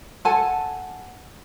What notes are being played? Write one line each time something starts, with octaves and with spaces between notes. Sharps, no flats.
A4 F#5 G#5 A5